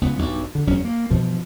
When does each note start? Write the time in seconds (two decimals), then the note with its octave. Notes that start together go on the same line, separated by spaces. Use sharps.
0.01 C#2 B3
0.19 B1 G2
0.55 D3
0.67 E1 F#2 F#3 C#4
0.85 A#3
1.11 G2 B2 E3 F3